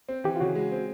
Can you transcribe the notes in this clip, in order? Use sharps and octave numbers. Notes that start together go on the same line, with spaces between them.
C4
E3 G4
F4
C#3 F#4
G#3
C4